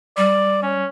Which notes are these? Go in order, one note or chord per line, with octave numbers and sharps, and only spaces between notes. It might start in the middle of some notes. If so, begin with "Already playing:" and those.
G3 D5
C#4